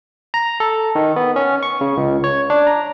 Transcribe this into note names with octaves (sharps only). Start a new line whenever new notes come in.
A#5
A4
D#3
B3
C#4
C#6
C#3
C#2
C#5
D4
A#5